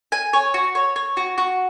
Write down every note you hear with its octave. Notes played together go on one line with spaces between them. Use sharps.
G#5
C#5
F#4
C#5
C#5
F#4
F#4